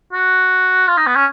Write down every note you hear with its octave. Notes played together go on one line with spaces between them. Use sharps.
F#4
F4
D#4
B3
C#4